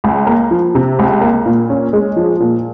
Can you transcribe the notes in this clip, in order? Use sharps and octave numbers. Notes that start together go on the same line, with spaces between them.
C#2
A#3
F3
C3
C#2
A#3
A#2
C#4
G#3
F3
A#2